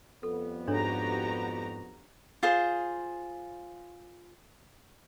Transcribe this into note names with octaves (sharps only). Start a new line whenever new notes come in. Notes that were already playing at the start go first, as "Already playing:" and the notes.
F2 G3 B3 A4
G#2 D4 F#4 G4 A4 C#5 A#5
F4 G#4 C5